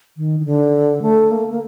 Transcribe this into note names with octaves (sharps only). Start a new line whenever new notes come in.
D#3
D#3
D3
A3
A#3
A#3